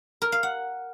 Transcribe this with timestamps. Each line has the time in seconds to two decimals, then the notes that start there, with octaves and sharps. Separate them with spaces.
0.22 A#4
0.32 F5
0.43 F#5